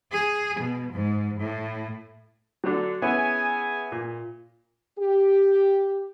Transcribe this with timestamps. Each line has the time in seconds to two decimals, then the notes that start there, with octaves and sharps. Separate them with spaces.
0.12 G#4
0.60 B2
0.93 G#2
1.40 A2
2.64 D3 F#3 D4
3.02 B3 C#4 E4 G#4 G#5
3.92 A#2
4.99 G4